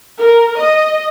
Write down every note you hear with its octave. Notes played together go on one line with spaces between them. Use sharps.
A#4
D#5